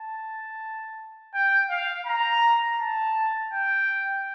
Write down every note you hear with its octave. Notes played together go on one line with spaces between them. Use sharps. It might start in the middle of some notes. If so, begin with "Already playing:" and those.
Already playing: A5
G5
F5
A#5
A5
G5